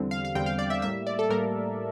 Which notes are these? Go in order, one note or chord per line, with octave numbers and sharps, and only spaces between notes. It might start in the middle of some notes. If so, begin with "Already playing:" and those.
Already playing: E2 D3 G3 C4
F5
F5
E2 D3 G3 C4 G5
F5
D5
E5
A2 G3 A#3 E5
D5
A4
A2 G3 A#3 A#4